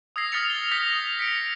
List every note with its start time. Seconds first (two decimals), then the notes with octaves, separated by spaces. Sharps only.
0.16 D#6 E6 G#6 A#6 C7
0.32 D#6 F6 A6 B6 C#7 F7
0.50 G7
0.71 D#6 G6 A#6 B6 C#7
1.19 B6 C#7 D7